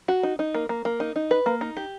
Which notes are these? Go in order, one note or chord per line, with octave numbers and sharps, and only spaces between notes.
F#4
D#4
D#4
A#3
A#3
A#3
D#4
D#4
B4
A#3
D#4
G4